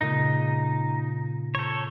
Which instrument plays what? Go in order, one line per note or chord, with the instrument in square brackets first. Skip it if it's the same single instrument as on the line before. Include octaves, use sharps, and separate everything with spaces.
[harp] A#2 C#3 G#3 [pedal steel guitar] D#4
[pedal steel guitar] A4 C#5 [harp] A#5 G6